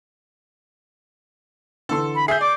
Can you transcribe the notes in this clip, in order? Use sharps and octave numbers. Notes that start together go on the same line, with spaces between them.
D3 E3 A4 C6 E6
B5
G#4 E5 G6 C7
D5 D6